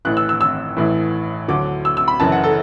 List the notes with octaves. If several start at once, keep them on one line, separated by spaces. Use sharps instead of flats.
A1 A2 E3 F#6
E6
E6
E6
A1 A2 E3
D2 D3 F#3 D6
E6
E6
B5
F#1 F#2 E3 A5
F#5
A4